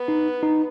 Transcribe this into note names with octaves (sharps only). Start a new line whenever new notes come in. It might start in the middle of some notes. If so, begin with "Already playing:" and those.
Already playing: B3
D#4
D#4